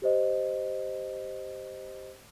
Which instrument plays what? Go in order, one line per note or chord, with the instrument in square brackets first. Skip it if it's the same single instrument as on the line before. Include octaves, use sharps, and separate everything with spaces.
[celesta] G4 C5 D#5